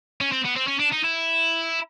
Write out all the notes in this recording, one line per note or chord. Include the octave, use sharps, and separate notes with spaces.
C#4
C4
B3
C4
C#4
D4
D#4
E4